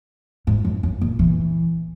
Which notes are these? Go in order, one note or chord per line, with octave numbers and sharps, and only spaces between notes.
G#2
F#2
F#2
A#2
E3